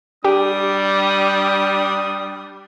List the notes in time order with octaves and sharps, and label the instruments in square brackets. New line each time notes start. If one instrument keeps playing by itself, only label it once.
[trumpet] G3 [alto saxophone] D4 [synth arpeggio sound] G4 [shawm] D#6